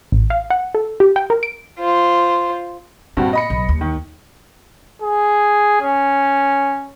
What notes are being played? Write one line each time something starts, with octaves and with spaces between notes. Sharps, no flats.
A1
F5
F#5
A4
G4
G5
A#4
D7
F4 C5
G2 A#2 C4 F#4
D#5 B5 C#7
B1
D#2
D#3
G#4
C#4